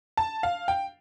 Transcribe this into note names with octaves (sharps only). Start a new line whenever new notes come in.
A5
F5
G5